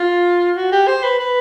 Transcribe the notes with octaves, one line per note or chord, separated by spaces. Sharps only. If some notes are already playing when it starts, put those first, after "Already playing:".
Already playing: F4
F#4
G4
C5
B4
B4